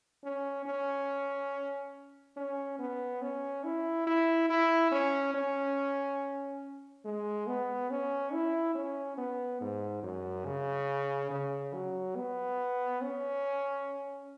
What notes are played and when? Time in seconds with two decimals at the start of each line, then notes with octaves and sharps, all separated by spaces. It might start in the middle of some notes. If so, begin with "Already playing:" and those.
0.24 C#4
0.66 C#4
2.37 C#4
2.79 B3
3.22 C#4
3.64 E4
4.07 E4
4.50 E4
4.92 C#4
5.35 C#4
7.05 G#3
7.47 B3
7.91 C#4
8.33 E4
8.75 C#4
9.18 B3
9.61 G#2
10.03 F#2
10.46 C#3
11.31 C#3
11.74 F#3
12.16 B3
13.02 C#4